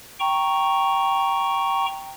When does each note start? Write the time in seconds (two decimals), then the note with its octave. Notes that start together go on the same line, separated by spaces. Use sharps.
0.20 G5 A#5 C#6